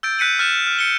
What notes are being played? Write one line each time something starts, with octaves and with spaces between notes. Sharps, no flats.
E6 G6 A6 D7
F#6 B6 C#7 D#7 F#7
F6 A6 E7
F6
C#7 G7